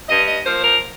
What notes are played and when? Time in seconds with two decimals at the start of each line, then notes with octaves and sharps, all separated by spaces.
0.09 G2 D#5
0.27 D#5
0.46 F3 A#3 C5
0.63 A#4